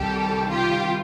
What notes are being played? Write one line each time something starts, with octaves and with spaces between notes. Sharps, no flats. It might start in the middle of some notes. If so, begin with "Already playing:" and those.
Already playing: C2 C3 D#3 G3 G4 A4
F4 G4